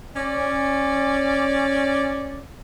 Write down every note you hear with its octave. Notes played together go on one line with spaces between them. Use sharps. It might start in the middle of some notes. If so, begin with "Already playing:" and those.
C#4 D5